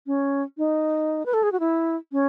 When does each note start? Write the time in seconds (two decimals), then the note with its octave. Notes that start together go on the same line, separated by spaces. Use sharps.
0.07 C#4
0.58 D#4
1.26 B4
1.33 A4
1.43 G#4
1.52 F#4
1.60 E4
2.12 C#4